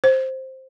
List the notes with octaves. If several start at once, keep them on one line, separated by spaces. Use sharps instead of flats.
C5